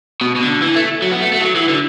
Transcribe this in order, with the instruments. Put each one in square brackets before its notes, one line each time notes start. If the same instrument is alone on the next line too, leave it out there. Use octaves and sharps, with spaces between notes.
[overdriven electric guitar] B2
B2
D3
E3
A3
F#3
B3
A3
A3
F#3
E3
D3